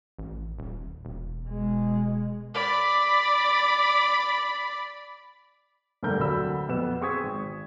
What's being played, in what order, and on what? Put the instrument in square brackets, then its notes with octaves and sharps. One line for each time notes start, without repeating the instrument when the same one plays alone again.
[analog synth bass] A1
D#1
E1
[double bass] B2 G#3
[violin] D5 B5
[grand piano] F1 G2 D3 A3 A#4 G6
D2 D3 F#3 C4 B5 E6
F2 B3 E7
C4 G#4 C#6 D#6 G#6 B6
G#1